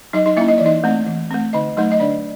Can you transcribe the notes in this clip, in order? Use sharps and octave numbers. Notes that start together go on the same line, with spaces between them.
F#3 D#4 D#5
D#4 D#5
A#3 C#4 E4 E5
D#5
E3 D5
D#4 D#5
A3 C4
E3
A3 C4
D3 D#4 D#5
F#3 A3 D#4 D#5
D#5
D3 D4 D5